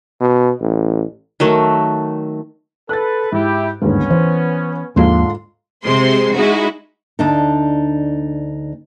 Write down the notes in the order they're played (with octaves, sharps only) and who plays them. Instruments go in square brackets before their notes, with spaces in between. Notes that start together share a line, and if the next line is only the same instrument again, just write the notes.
[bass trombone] B2
A1
[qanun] D#3 F#3 A3
[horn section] A4 B4 [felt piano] F#6 A6
[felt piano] G#2 [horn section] E4 G4
[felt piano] G1 D#2 G#2 [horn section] B3 C#4
[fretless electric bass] E3 [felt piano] C5
[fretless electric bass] D#2 F3 A#3 [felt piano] G#2 F4 [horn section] D3 C6
[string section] C3 G#3 C5 C6
G#3 D#4 E4 F#4
[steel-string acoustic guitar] D2 D4 D#4